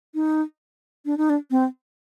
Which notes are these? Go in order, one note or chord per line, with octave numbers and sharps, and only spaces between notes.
D#4
D4
D#4
D4
C4